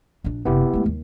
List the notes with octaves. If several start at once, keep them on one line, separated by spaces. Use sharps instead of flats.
A#1 D4
F#1 C3 B3 E4 G4
G#3 A3
D#2